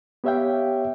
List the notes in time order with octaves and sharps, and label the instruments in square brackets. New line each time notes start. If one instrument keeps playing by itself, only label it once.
[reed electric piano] B3 G4 C#5 E5 F5 G5